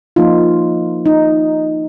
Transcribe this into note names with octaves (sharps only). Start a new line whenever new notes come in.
F3 A#3 D#4 F4
D#4